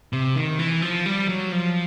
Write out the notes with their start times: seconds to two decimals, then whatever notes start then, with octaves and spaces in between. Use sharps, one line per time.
0.13 C3
0.36 D#3
0.59 E3
0.82 F3
1.06 G3
1.29 F#3
1.52 F3